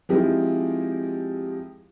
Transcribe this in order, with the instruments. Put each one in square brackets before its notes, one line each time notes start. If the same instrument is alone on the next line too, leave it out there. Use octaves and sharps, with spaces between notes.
[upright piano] F3 G#3 C4 D#4 E4 G4